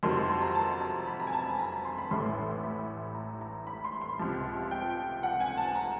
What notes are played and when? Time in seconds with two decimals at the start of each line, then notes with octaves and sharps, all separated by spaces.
0.03 F2 C3 D#3 F#3 C6
0.15 C6
0.29 C6
0.42 A#5
0.55 A5
0.81 A#5
1.07 B5
1.20 A#5
1.27 G#5
1.33 A5
1.46 B5
1.59 A#5
1.72 B5
1.85 C6
1.98 B5
2.11 A1 A2 E3 C6
2.63 B5
3.15 A#5
3.41 A#5
3.67 B5
3.84 C6
4.02 C6
4.19 C#2 C3 F3
4.71 G5
5.23 F#5
5.40 G#5
5.57 A5
5.75 A#5